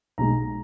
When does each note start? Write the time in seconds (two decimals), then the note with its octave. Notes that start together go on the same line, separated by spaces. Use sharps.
0.18 B1 B2 G#3 A#5